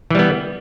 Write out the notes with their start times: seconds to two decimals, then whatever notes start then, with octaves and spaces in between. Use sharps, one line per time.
0.11 E3
0.15 G3
0.19 B3